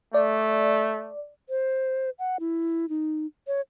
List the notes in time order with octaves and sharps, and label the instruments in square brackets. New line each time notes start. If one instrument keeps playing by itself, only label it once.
[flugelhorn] A3 [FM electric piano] D5
[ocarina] C5
F#5
E4
D#4
C#5